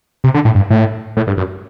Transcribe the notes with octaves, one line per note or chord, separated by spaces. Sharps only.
C3
D3
A2
G2
A2
A2
G2
F#2